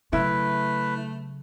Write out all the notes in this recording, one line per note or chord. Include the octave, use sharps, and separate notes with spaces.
C#3 F#3 A3 E4 B4